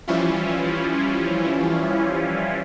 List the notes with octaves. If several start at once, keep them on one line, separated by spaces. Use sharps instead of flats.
E3 F3 G3 C#4 E4 F4